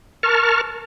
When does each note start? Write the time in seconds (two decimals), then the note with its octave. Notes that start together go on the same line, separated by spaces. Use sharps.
0.23 A#4 A5 C#6 F6